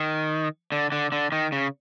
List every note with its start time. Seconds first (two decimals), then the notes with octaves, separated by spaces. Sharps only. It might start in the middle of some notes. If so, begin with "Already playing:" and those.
Already playing: D#3
0.72 D3
0.92 D3
1.12 D3
1.32 D#3
1.52 C#3